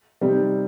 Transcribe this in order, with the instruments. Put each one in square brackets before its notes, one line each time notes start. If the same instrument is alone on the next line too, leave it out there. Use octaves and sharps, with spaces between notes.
[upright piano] C3 G3 C4 D#4